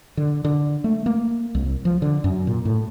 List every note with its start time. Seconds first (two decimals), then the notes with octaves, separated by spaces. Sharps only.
0.17 D3
0.45 D3
0.84 A3
1.06 A#3
1.55 C2
1.85 F3
2.02 D3
2.24 F#2
2.47 A#2
2.65 A2